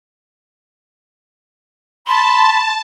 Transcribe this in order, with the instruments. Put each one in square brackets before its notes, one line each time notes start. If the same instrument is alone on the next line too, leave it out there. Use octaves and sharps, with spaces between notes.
[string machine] A5 [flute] B5 [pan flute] C6